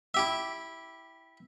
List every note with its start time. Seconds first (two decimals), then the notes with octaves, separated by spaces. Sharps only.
0.14 E4 G4 E5